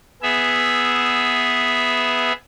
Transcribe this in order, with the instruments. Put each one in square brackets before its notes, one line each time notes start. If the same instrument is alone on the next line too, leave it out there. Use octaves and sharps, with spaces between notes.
[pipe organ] B3 G#4 E5